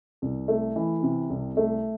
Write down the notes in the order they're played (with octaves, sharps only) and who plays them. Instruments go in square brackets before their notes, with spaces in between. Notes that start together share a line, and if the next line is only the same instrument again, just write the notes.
[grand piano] C2
A3
E3
C3
C2
A3